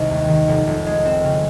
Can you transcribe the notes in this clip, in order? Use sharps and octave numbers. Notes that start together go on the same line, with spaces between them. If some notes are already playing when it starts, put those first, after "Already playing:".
Already playing: C2 C3 D#3 G#3
D#2
D#3
F1
F1
G#3
C4
C#3